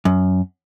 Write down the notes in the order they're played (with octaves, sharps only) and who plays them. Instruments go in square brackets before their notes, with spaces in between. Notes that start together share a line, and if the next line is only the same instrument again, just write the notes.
[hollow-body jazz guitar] F#2